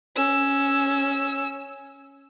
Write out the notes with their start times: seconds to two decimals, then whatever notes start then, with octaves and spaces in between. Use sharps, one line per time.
0.16 C#4 E6